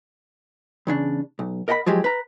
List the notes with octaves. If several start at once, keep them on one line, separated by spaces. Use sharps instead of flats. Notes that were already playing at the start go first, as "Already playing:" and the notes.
E2 C#3 D4
B1
A#4 D#5 F#5 G5 B5
F3 F#3 G#3 G4
B4 A#5